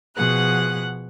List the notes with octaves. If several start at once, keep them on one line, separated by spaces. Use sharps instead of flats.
B2 F3 G#4 F#5 F#6